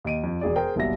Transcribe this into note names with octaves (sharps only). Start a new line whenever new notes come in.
D#2 D#5 D7 D#7
F2
E1 G#4 D5
G#4 A#4 C5 G5
F#1 B1 B2 G3 E5 A#6